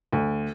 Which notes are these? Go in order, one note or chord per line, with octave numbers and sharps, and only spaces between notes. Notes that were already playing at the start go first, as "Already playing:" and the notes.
D2